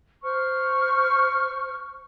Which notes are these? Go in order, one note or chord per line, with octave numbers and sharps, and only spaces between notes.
C5 C#6 F6